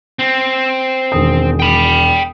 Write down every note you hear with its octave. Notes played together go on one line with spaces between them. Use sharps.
C4
E1 D#3 D#6
G5 B5